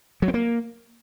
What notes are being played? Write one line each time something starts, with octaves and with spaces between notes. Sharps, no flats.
F#3
C4
A#3